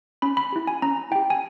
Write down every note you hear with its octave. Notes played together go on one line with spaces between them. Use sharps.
C#4 B5
B5
E4 G4
G#5
C#4 A#5
E4 G4 G5
G#5